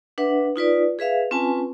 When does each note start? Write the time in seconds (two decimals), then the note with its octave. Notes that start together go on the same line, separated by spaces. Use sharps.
0.18 D4 B4 E5 F#5
0.56 D#4 F4 B4 D5
0.99 G#4 B4 E5 F5
1.31 C4 C#4 F4 B4 G#5 A5